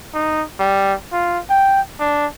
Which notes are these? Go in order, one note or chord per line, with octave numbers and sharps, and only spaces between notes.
D#4
G3
F4
G5
D4